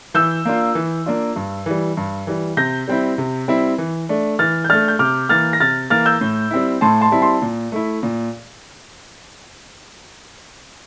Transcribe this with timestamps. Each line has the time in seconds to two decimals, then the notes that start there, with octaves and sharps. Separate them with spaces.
0.14 E3 E6 G6
0.45 A#3 D4 F4
0.75 E3
1.06 A#3 D4 F4
1.36 G2
1.66 E3 G3
1.97 G2
2.27 E3 G3
2.57 C3 G6 A#6
2.88 G3 C4 E4
3.18 C3
3.48 G3 C4 E4
3.78 E3
4.09 A3 D4
4.39 E3 F6 A6
4.64 G6
4.69 A3 D4 F6 A6
4.88 G6
4.99 C3 D6 F6
5.29 E3 A#3 F6 A6
5.53 A#6
5.60 C3 F6 A6
5.90 E3 A#3 F6 A6
6.06 E6 G6
6.21 A2
6.51 G3 C4 E4
6.81 A2 A5 C6
7.01 A5 C6
7.12 G3 C4 E4
7.22 A5 C6
7.42 A#2
7.72 A3 E4
8.03 A#2